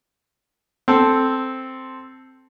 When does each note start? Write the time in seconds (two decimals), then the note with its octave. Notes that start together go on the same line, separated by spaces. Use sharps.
0.88 C4 A4